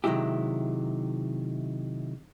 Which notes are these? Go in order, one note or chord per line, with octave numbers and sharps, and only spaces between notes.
C3 D#3 F#3 G#3 E4 G4